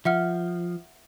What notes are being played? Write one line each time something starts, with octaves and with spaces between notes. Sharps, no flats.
F3 E5 F#5 F6